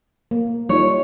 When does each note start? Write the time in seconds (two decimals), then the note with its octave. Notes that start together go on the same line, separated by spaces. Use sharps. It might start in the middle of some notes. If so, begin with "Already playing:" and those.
0.31 A#3
0.69 G3 D#4 F4 C#5